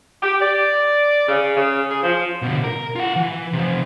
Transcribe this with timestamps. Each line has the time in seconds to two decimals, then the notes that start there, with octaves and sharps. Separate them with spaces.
0.23 G4
0.41 D5
1.28 C#3
1.57 C#3
1.89 G#4
2.03 F3
2.42 B2 D3
2.64 A#4
2.96 F4 F#5
3.16 E3
3.53 C3 F3